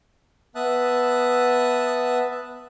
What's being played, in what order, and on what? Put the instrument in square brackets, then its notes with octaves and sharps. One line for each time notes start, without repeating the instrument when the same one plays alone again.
[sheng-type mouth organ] B3 E5 A5 D#6 F#6